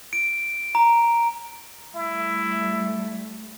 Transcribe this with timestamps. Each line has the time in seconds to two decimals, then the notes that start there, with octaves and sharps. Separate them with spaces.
0.13 D7
0.75 A#5
1.95 G3 A3 E4